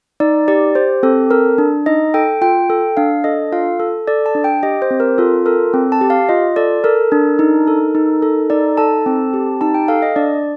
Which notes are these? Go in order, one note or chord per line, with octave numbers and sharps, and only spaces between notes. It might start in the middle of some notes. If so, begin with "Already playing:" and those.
D#4 D5
G4 D5
G4 C5
C4 A4
A4 A#4
D4
D#4 D#5
A4 G5
F4 G5
A4
D4 F5
A4 D#5
F4 F5
A4
A4 D5
A5
D4
G5
G4 D#5
C5
C4
A#4
F4 A4
A4 A#4
C4
A5
G4
F5
F4 D#5
A4 D5
A4 A#4
D4
D#4
A4
D#4
A4
D#4 D5
A4 A5
C4
G4
D#4 A5
G5
A4 F5
D#5
D4 D5